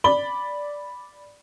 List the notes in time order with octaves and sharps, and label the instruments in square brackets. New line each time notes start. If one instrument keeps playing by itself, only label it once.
[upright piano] D5 B5 G7